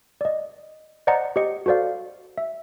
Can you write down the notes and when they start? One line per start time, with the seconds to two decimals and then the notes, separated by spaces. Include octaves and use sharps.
0.21 D5 D#5
1.07 C5 D5 D#5 F#5 A#5 C#7
1.36 G4 C5 D#5 C#7
1.66 F#4 A4 C5 D5 F5
2.38 E5